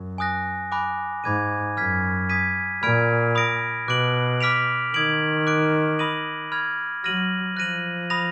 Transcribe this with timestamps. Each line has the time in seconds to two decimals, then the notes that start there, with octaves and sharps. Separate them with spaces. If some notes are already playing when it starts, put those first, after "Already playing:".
Already playing: F#2
0.18 G#5 D#6 F#6 A#6
0.72 G#5 B5 D6 F#6
1.24 G#2 B5 D6 G#6 D#7
1.77 F#2 F6 G#6 B6
2.29 D#6 G#6 B6 D#7
2.83 A#2 B5 F6 G#6 D7
3.35 B5 D#6 A#6 D7
3.88 B2 D6 F#6 D7 F#7
4.41 D6 F6 B6 D7 F7
4.94 D#3 D#6 G#6 D7 F#7
5.47 D6 F#6 D7
5.99 B5 D#6 A#6 D#7 F#7
6.52 B5 F6 G#6
7.04 F#3 F6 A#6 D#7 F#7
7.57 F3 F#6 A#6 D#7 F#7
8.10 B5 D#6 A#6 F7